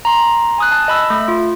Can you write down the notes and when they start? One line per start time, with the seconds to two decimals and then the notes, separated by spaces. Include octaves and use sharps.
0.05 A#5 C6
0.58 G#5 D#6 F#6
0.71 A5
0.88 D#5 B5 E6
1.10 A3
1.28 F4